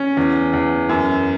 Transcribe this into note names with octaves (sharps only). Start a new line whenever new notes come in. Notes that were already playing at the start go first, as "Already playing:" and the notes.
Already playing: C#4
E2
E2
F#2